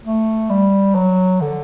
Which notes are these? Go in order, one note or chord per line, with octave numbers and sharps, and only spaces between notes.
A3
G3
F#3
D3